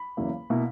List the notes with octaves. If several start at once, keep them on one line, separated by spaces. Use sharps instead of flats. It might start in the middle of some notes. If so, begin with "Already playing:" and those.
Already playing: B5
E2 C#3 F#3 A#3 E4
B2 A#3 E4